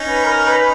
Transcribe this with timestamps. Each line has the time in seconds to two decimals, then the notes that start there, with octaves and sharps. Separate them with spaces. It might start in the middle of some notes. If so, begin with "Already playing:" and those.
Already playing: C#4 D#4
0.08 B4
0.24 A#4
0.47 B4